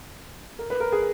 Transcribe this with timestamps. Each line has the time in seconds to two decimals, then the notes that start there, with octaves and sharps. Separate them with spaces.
0.59 A#4
0.70 B4
0.80 A#4
0.92 G#4